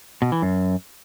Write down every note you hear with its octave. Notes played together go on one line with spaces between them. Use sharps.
B2
E3
F#2